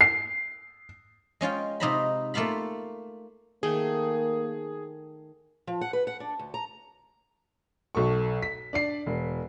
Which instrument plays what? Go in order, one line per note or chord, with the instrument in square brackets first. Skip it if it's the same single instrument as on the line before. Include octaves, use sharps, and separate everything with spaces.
[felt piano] C7
[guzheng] G#3 C#4 F4 G5
C3 D#4 F4 C5 A#5 B5
A3 A#3 F4 F5 B5
[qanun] D#3 A3 [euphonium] A#3 [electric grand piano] G#4
[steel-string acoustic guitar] F3
F#5
B4
F#5
D4
D2
A#5
[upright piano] B1 A4 C#6
B6
D4 D5 C7
E1